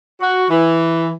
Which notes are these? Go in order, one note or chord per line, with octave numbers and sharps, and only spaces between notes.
F#4
E3